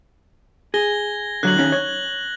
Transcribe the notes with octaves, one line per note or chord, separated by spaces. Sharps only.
G#4 G#6 A#6 G7
D3 F#3 F#6 F#7
D#3 C#4
C#5